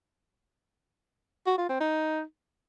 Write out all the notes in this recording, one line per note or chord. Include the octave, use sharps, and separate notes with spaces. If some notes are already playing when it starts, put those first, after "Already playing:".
F#4
F4
C4
D#4